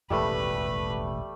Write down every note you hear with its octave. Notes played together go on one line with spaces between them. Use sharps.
E1 A1 D#2 G3 A3 B4